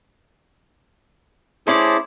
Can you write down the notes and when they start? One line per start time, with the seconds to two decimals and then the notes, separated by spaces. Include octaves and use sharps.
1.67 A3 C#4 E4 G#4 C5 D5